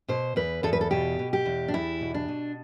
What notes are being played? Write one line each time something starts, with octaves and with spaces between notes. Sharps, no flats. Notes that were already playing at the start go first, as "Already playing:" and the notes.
B2 C5
E2 B4
E2 A4
B4
A4
B2 G4
B2
G4
E2
D4
E2 E4
B2
D4
B2